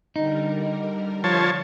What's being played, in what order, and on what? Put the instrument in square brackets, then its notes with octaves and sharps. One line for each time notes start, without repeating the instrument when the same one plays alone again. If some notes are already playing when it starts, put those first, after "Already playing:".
[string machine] D3 G3 A#4 [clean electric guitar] D#4
[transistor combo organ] F3 C#5 A5